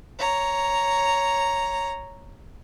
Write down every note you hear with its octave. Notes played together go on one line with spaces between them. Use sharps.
C#5 A#5